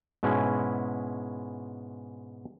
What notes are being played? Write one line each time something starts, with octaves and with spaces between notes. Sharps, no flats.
G#2 B2 G#3 C#4 E4